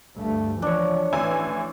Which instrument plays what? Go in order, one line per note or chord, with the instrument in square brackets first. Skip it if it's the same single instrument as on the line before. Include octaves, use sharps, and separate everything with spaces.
[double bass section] D2 G2 A3
[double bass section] E3 F3 [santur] D4 C#5
[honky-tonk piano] A1 G#5 E6 [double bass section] E3